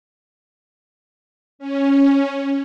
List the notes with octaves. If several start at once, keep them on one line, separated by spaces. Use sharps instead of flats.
C#4